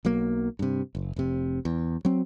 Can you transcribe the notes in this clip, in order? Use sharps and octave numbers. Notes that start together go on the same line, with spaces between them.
B1 F#3 A#3
G2 C3
F#1
F1 C3
E2
F#3 C4